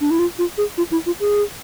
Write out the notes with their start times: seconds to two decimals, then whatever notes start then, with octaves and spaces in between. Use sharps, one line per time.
0.01 D4
0.11 E4
0.19 F4
0.39 F4
0.58 G#4
0.78 F4
0.91 E4
1.06 F4
1.20 G#4